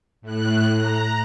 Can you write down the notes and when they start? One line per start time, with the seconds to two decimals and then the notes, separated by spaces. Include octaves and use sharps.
0.22 A2 F#6
0.77 A#5